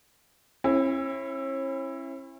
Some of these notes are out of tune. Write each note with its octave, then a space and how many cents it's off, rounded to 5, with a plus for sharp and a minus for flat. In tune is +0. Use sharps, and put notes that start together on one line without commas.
C#4 -45 E4 +10